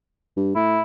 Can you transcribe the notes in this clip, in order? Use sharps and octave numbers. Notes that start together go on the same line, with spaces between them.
G2
A2 E4